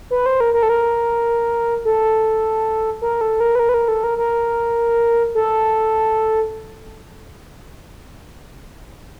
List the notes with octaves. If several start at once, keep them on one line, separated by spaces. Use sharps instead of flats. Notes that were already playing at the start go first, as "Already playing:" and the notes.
B4
C5
A#4
A#4
A4
A#4
A4
A#4
A4
A#4
B4
A#4
B4
A#4
A4
A#4
A#4
A4